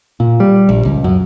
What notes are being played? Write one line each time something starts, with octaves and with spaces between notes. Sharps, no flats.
A#2
G3
A#1
C#2
F#2